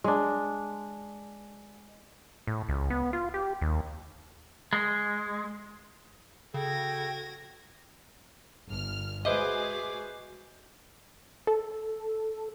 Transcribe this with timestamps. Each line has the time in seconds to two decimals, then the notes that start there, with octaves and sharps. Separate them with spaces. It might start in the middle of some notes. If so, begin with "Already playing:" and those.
0.04 G#3 D4
2.47 A2
2.69 C#2
2.90 B3
3.13 F4
3.34 G4
3.61 D#2
4.73 G#3
6.54 C#3 F#4 A4 G5 G#6 A#6
8.67 G1 F6
9.25 G#3 F#4 G#4 B4 C5 D#5 E5 D6
11.47 A4